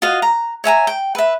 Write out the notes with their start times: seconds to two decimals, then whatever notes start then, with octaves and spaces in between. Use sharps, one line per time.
0.02 F4 F#4 D#5 F5
0.22 A#5
0.64 C#5 E5 G#5 A#5
0.87 G5
1.15 B4 E5